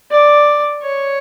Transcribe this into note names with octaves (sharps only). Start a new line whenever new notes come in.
D5
C#5